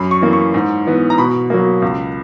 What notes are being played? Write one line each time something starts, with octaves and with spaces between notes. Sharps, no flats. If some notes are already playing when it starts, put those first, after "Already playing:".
Already playing: F#2 B5
C#6
E3 A#3
C#6
G#2
E3 B3
A#5
B2 B5
F#3 A#3
C#2